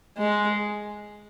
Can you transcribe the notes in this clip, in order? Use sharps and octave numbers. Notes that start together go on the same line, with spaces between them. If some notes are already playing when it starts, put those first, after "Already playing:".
G#3